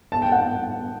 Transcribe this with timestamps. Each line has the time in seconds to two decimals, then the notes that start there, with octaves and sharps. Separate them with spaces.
0.12 A5
0.22 G5
0.32 F#5